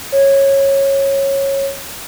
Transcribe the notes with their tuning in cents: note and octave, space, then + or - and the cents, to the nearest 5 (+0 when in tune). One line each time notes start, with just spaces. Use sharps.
C#5 -15